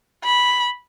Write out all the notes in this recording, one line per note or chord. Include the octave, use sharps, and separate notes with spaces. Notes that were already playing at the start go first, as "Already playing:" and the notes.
B5